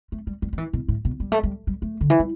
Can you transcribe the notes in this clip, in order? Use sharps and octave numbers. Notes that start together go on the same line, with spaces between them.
A3
G3
G3
G3
E3
B2
A2
B2
G3
A3
G3
G3
A3
D3
E3
G3